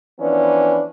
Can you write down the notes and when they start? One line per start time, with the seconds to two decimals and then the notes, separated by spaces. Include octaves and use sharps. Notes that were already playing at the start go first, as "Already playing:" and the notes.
0.20 E3 F3 B3 C#4 D4